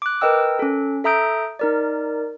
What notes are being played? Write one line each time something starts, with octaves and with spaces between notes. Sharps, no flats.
D6 F#6
A#4 B4 D#5 G5 E6
C#4 A4
A4 E5 A#5 D#6 G6 D7
D#4 A#4 D5